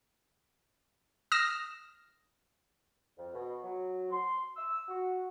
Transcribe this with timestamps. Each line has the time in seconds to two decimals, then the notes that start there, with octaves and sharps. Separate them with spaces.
1.32 D#6 F6 A#6 E7
3.18 F2
3.33 B2
3.63 F#3
4.11 C6
4.56 E6
4.88 F#4